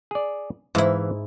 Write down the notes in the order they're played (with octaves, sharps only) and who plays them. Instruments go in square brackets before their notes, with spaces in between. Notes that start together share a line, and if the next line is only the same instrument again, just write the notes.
[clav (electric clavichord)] G#4 D5
[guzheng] G#2 E4 [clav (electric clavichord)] E3 F5